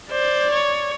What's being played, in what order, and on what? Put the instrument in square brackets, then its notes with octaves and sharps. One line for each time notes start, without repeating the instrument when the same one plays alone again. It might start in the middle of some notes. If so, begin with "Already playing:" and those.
[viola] C5 [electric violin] D5
[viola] C#5